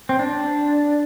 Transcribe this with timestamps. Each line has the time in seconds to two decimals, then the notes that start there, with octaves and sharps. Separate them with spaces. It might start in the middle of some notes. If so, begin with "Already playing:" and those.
0.09 C4
0.19 D4